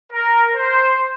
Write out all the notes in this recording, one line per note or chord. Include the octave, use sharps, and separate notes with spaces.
A#4
C5